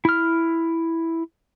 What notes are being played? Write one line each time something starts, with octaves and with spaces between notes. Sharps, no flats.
E4 F6